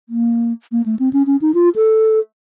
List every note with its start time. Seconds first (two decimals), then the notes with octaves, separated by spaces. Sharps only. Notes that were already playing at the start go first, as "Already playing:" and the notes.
0.09 A#3
0.72 A#3
0.86 A3
0.99 C4
1.13 C#4
1.26 C#4
1.41 D#4
1.54 F4
1.76 A4